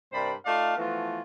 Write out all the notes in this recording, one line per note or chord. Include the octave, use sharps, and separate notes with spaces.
G2 C3 A#4 C5 D5 B5
A3 D#4 F4 D5 F5
E3 F3 A3 B3 F4 F#4